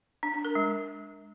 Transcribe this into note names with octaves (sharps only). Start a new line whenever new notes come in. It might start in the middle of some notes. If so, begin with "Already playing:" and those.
D4
D4
A#4
G#3